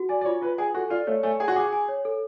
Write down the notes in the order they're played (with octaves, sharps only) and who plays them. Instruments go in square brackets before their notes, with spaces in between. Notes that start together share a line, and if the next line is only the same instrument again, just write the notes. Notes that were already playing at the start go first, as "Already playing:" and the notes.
Already playing: [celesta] F#4
[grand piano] D5 [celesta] G#5
[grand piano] D5
[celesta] F4 [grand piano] C#5
[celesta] F4 [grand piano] B4
[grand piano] G#4 [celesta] G#5
[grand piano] F#4 [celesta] A4
[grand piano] F4 [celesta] D5
[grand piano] A3 [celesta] C#5
[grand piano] A3 [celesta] G#5
[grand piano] G#4 [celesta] G#5
[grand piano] F#4
[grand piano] G#4 [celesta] D6
[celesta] G#5
C#5
A4